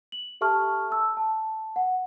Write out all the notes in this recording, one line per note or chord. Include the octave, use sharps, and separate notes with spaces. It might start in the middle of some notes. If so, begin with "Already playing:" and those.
F#7
G4 A4 E5 A5 C#6 F6
A5 E6
A5
F#5